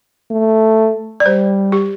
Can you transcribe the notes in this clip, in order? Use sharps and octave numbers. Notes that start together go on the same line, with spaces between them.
A3
D5
G3 C5
G4